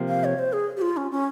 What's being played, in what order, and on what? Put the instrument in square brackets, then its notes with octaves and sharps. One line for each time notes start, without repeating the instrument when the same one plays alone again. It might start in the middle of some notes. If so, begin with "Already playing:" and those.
Already playing: [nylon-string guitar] C3 F3 A#3 F4
[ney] F5
C#5
C5
G#4
G4
F4
C#4
C#4